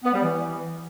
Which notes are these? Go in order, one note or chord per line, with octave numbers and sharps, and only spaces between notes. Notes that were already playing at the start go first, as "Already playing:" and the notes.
B3
G3
E3